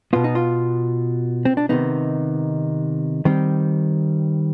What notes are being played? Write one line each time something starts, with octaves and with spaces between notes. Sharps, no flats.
B2 B3 F4
D#4
F4
C4
D4
C3 D#3 B3 D#4
D#3 G3 C4